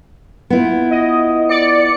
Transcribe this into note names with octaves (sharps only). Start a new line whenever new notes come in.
B3 E4 F4
D#5
D5 C#7